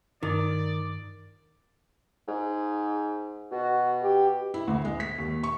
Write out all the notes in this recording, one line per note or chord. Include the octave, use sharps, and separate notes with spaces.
G2 D#3 D5 D6
G#2
B2 F#4
G4
E4
D2
G#3
B6
D#2
C#6